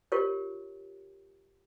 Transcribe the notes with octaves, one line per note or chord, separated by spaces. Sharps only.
F4 G4 A#4 C#5